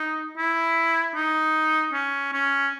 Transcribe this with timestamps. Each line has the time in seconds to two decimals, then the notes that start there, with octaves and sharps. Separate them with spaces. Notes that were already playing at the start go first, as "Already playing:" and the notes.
Already playing: D#4
0.37 E4
1.15 D#4
1.93 C#4
2.33 C#4